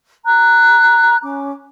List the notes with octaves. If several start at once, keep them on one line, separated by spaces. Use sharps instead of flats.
A#5 F#6
C#4 D6